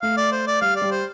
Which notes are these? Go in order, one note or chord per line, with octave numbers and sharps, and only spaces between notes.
A3 F5
D5
C5
D5
G3 F5
D5
G3
C5